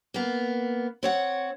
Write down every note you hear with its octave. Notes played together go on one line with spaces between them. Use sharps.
A#3 B3
C4 C#5 F#5